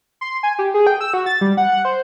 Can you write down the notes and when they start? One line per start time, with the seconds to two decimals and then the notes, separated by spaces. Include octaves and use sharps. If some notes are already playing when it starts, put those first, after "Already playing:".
0.21 C6
0.43 G#5
0.59 G4
0.74 G#4
0.87 G5
1.01 E6
1.14 F#4
1.26 A6
1.41 G3
1.57 F#5
1.72 F#5
1.85 C5